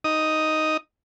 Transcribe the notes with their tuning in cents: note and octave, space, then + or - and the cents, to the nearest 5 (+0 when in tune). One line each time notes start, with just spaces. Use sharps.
D#4 +0 D#6 +0